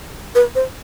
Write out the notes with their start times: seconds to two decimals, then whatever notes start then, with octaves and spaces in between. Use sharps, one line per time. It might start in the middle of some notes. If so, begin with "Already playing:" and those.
0.35 B4
0.55 C5